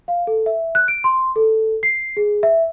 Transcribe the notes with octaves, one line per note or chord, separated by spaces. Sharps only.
F5
A4
E5
F#6
D7
C6
A4
C7
G#4
E5